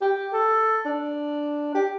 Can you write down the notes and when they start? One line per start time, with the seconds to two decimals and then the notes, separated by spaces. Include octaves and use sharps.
0.01 G4
0.33 A4
0.85 D4
1.75 G4